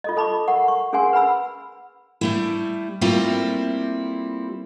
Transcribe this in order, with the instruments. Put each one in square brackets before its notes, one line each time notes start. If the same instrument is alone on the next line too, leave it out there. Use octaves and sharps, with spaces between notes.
[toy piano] F4 A4 D#5
A4 A5 B5 C#6 D6
A#4 F#5 C#6
C#6
C#4 G#4 A#4 F#5 G#5 C6
B4 F#5 B5 E6
[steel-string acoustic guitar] G3 A3 E4
G3 A3 A#3 C4 E4 F4